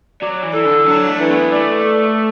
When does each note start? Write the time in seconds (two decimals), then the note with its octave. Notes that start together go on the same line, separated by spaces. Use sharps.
0.21 F#3 D5
0.43 E3
0.54 E3 A4
0.65 D3
0.86 F#3 D4
1.08 A3
1.19 E3
1.30 B3
1.51 A3 D5
1.83 A4